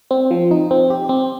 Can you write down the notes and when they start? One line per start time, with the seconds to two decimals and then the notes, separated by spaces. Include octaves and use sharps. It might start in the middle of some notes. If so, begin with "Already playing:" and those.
0.11 C4
0.31 F3
0.51 D#4
0.71 C4
0.90 G4
1.09 C4